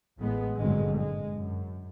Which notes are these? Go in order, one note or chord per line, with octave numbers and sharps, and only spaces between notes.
A1 A2 G#3 B3
G#1 G2 A#2 D3 F#3 G#3
G#3
F#2